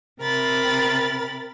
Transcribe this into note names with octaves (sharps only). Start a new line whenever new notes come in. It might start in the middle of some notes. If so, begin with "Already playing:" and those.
C3 A#4 B5 A6